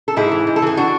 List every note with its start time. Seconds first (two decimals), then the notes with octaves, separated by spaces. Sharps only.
0.08 A4
0.16 G#2 E4 G#4
0.32 E3
0.47 G#2
0.56 A4
0.62 E3 G#4
0.77 D4 F#4